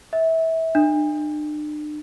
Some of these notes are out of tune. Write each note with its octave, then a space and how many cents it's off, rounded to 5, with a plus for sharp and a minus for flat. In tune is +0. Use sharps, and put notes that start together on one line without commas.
E5 -25
D4 +40